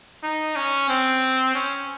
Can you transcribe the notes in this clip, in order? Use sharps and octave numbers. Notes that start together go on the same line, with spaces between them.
D#4
C#4
C4
C#4